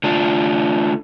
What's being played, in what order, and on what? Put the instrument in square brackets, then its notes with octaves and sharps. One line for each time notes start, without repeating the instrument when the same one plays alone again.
[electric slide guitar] D3 A3 D4 F4